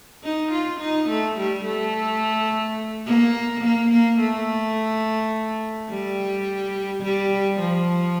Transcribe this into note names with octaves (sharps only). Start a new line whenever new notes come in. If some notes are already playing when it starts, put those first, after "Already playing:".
D#4
F4
D#4
A3
G3
A3
A#3
A#3
A#3
A3
G3
G3
F3